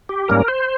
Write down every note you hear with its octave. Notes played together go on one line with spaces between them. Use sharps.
G4
G#2 G3 A#3 C#4 A#4
C5